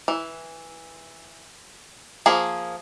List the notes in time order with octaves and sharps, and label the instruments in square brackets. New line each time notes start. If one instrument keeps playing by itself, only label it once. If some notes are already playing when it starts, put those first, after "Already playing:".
[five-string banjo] E3
F3 A#3 G#4